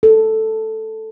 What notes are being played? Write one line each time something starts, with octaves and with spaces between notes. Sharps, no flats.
A4